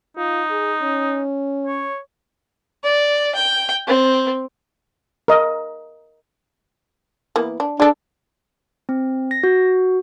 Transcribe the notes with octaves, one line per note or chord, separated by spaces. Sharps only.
D#4 F4
G#4
C#4
C#5
D5
G5
C4
A#4 D#5
E3 A#3 B3
D4
D4 G#4 A4
C4
A#6
F#4